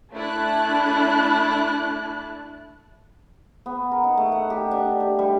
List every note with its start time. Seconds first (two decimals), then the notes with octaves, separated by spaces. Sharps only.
0.14 A3 D4 E4 A5 F#6
3.66 B3
3.92 A#4
4.04 D#4
4.18 A3
4.32 F#5
4.50 G4
4.71 D4
5.00 G4
5.19 G3